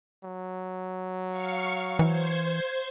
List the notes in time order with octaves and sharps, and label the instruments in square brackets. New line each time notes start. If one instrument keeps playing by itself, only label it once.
[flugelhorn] F#3
[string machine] F5 C#6 C#7
[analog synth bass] E3 [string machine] C5 G#6